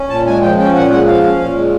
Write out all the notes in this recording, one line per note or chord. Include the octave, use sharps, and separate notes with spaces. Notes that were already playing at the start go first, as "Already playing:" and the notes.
Already playing: C#4
A#2 A5
G#3 G#5
F3 G5
C#4 G5
A#2 F#5
G#3 F#5
F3 F5
C#4
A#2
G#3